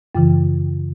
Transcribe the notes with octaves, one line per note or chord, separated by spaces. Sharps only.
F#2 C#3 E3